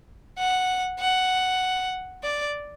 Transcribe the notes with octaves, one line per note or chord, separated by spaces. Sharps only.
F#5
F#5
D5